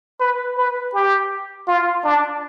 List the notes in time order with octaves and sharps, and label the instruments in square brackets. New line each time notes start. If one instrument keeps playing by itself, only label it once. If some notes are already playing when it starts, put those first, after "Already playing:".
[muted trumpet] B4
B4
G4
F4
D4